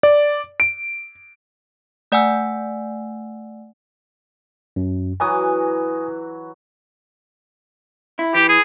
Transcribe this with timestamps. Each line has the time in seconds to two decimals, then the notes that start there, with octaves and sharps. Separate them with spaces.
0.03 D5
0.60 D7
2.12 A3 D5 F#5 G#5 E6
4.76 F#2
5.20 E3 F#3 G#5 D#6
8.19 E4
8.35 E3 G4
8.49 G#4